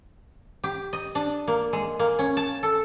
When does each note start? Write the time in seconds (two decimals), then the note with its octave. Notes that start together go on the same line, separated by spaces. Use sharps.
0.64 G4
0.93 D#5
1.15 D4
1.48 A#3
1.73 G#3
1.99 A#3
2.19 C#4
2.37 A5
2.63 A4